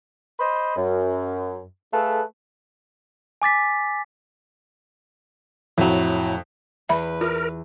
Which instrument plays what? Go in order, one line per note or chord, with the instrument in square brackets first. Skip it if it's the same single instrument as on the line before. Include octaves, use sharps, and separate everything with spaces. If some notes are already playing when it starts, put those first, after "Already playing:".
[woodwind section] C5 D#5 B5 C6
F#2
A3 G#4 A4 B4 F5
[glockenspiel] G#5 D6 A6 B6
[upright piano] F2 [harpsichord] A2 F#3
[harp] E2 [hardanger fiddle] B4 [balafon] E5 B5
[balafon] F4 [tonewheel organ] A#4